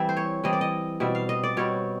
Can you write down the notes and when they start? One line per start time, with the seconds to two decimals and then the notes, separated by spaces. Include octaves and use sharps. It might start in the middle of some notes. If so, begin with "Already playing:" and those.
Already playing: E3 G3 C4 E5
0.09 C5
0.17 C#5
0.44 E3 G3 C4 D#5
0.53 D5
0.61 D#5
1.00 B2 G3 C4 E5
1.15 F5
1.29 D#5
1.44 D5
1.57 B2 G3 C4 C#5